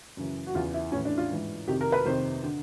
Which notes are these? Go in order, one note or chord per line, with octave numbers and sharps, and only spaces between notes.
F#2 C#3 E3
F#4
E2 C#3 E3 F4
E4
A2 E3 C#4
D4
F4
G#2 E3
F2 C3 D#3 G4
A#4
B4
F2 C3 D#3 C5
D3